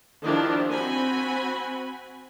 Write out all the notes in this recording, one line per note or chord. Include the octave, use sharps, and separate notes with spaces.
D#3 F3 D4 E4 G4
C4 F#4 G#5 B5